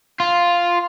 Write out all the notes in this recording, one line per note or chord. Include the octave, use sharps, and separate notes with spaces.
F4